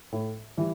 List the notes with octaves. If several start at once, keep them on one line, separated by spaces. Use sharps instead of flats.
A2
E3 G3